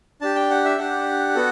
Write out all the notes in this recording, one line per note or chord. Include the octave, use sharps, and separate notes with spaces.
D4 G4 A5
G5
F#5
E5
D4 G4 F#5
B3 F#4 A4